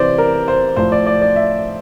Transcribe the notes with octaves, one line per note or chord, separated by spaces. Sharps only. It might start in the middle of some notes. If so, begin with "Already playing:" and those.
Already playing: C3 E3 C5 D5
A#4
C5
A2 F3 C5
D5
D5
D5
E5